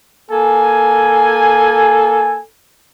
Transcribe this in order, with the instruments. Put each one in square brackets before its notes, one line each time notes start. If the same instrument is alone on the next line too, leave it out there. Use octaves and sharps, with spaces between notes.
[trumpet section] A#3 G#5 [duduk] A4